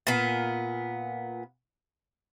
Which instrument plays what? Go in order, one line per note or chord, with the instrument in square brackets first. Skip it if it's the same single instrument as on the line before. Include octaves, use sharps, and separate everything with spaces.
[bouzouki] A#2 B3